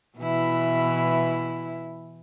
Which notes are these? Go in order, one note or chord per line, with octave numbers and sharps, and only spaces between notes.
B2 E3 E4